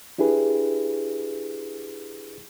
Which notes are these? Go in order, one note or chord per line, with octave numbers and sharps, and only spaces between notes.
D4 E4 G4 G#4 B4